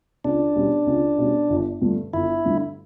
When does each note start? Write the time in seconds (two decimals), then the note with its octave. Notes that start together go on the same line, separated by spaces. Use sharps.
0.24 C#2 D4
0.55 B2 G3 C#4
0.87 C#2
1.18 B2 G3 C#4
1.50 G1
1.81 G2 D3 A3
2.13 G1 E4
2.45 G2 D3 A3